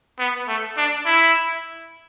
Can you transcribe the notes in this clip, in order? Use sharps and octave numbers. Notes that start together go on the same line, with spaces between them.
B3
A3
D4
E4